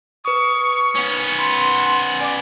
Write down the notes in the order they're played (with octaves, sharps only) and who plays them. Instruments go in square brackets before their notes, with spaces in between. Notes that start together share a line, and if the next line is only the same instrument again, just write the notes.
[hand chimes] B4 D#6 [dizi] C#6
[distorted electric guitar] B3 C#4
[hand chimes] B5 [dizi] C6
[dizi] D5 [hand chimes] G#5 D6